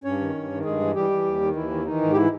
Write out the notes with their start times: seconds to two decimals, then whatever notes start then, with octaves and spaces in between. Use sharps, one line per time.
0.04 G2 C#4 C#5
0.20 D#3
0.35 G2
0.50 D#3
0.64 G2 G#3 G#4
0.80 E3
0.95 E3 G3 G4
1.11 E3
1.25 D#2
1.41 D#3
1.55 D#2 E3 E4
1.70 D#3
1.85 D#3 E3 D#4
2.01 G#2
2.12 G4
2.15 E3 E4